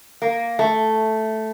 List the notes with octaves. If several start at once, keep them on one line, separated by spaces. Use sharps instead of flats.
A#3
A3